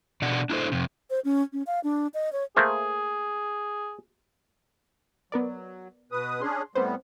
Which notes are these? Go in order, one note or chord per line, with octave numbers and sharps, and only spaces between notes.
B2 D4 F#5
D4 E4 A4 C5
F2 C3
C5
C#4
C#4
F5
D4
D#5
C#5
A3 A#3 G#4 C5
F#3 B3 A#4 D5
B2 B4 D#6
C#4 D4 G#4 C6
A2 G3 B3 C4 B4 C5